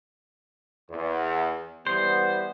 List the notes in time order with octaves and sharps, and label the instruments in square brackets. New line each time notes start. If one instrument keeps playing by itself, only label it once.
[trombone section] E2
[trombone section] E3 G3 B3 [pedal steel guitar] C5